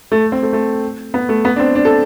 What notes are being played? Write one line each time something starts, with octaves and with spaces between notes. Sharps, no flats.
A3
C4
A3
A3
B3
A3
B3
D4
C4
D4
A4